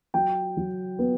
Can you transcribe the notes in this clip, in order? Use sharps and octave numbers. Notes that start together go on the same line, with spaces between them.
F#3 G5
F#3
B3